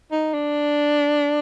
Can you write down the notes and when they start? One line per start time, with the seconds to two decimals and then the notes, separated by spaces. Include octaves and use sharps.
0.12 D#4
0.34 D4